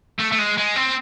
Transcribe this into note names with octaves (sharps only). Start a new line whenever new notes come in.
A3
A3
G#3
G#3
C4